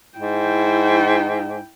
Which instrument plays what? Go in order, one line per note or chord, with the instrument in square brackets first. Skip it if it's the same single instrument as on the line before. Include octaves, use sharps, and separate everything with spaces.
[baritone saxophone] G#2 [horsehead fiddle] E4 G5